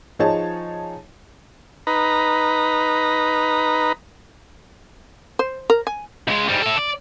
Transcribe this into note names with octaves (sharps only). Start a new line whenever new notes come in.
F3 D#4 G#4 C#5 A5
D#4 B4 A#5
C5
A#4
G#5
C#2 G#3
G#2 G3
E4 A4
D5